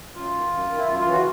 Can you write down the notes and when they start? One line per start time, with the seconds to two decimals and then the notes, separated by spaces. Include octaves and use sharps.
0.15 F#2 F4
0.33 D#3
0.52 F#2
0.69 D#3
0.77 E4
0.87 F#2 F4
0.99 F4
1.05 C#3 E3
1.11 F#4